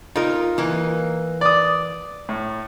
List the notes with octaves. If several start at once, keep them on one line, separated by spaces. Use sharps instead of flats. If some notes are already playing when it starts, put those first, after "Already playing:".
D#4 F4 A#4
E3 A#3
D5 D#6
A2